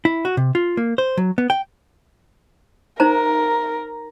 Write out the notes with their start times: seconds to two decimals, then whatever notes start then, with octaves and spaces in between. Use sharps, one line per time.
0.05 E4
0.25 F#4
0.37 C3
0.55 F4
0.77 A#3
0.98 C5
1.17 F#3
1.38 B3
1.50 G5
3.00 D#4 A#4 C5 A#5